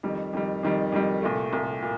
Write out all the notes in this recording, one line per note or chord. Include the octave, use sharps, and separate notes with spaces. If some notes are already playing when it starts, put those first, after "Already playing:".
F2 D#3 G3
F2 D#3 G3
F2 D#3 G3
F2 D#3 G3
C2 A#2 A3
C2 A#2 A3
A#2